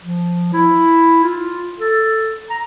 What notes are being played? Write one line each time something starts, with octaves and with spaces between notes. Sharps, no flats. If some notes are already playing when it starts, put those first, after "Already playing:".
F3
E4
F4
A4
A#5